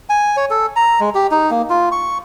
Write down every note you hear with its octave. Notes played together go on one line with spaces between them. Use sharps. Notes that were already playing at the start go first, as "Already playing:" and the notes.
G#5
C#5
A4
A#5
G#3
G4
D#4
A#3
F4
C#6